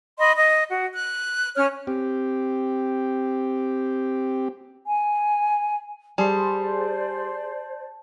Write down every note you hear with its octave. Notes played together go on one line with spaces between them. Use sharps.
D#5 B5 C6
D#5
F#4
F#6
C#4 C#5 F6
C4 G4
G#5
G3 G#4 C5 D5 A5 C6